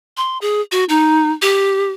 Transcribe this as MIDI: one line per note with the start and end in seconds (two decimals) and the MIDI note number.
0.17 0.38 84
0.41 0.61 68
0.72 0.84 66
0.89 1.31 63
1.42 1.90 67